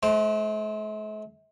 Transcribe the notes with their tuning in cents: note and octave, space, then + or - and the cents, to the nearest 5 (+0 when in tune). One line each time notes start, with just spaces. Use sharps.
A3 -45 C5 +0